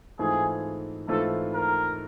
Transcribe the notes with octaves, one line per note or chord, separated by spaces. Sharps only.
G#2 E3 A3 C4 F4 G#4
G#2 E3 A3 C4 F4 A4
A#4